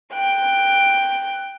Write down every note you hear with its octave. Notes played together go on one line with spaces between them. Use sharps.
G5 F#6